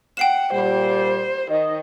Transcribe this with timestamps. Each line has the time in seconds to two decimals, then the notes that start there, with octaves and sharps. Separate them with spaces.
0.17 F#5 G5 C7 E7
0.53 A#2 G3 C5
1.51 D#3 D#5